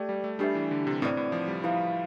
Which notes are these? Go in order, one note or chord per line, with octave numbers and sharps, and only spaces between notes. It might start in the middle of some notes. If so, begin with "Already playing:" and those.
Already playing: A3 G4 D5 G5
G3
A3
G3 D4 G4 B4 E5
E3
D3
C3
A2 C4 E4 B4 D5
A2
F3
G3
F3 E4 B4 F5